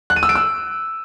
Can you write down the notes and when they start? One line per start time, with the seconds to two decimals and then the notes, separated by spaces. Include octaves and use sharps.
0.10 F#6
0.16 D#7
0.23 E6
0.29 D7
0.35 E6